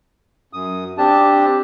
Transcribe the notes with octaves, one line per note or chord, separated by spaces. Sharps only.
F#2 D#6
C4 D4 G4 A5